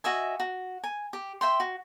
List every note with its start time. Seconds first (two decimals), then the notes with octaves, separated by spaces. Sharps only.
0.04 F#4 D#5 E5 G#5
0.40 F#4
0.84 G#5
1.13 G4
1.41 E5 G5 C6
1.60 F#4